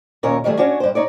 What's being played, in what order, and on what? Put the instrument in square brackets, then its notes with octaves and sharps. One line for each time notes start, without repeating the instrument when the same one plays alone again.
[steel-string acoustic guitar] D#2 A#2 C#4 A#4 C#5
D#3 F3 G3 A3 G#4
C#4 D4 F#4 C#5 D5
G2 C5
D#4 C#5 D5